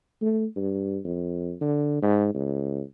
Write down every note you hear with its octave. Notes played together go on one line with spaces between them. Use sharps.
A3
G2
F2
D3
G#2
C#2